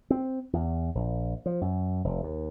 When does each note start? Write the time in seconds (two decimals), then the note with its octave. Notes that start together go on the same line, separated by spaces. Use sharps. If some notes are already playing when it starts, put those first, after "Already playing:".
0.10 C4
0.53 E2
0.95 A#1
1.46 F3
1.61 F#2
2.04 F1
2.23 D#2